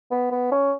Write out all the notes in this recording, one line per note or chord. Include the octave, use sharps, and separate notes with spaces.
B3
B3
C#4